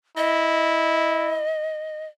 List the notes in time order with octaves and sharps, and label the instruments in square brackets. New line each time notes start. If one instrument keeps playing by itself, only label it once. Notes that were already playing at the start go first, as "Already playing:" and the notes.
[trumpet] E4 [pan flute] D#5